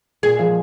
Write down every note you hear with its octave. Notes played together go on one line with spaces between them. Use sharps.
A#2 G#4
F3 G#3